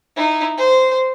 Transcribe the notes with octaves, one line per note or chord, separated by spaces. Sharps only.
D#4 E4
C5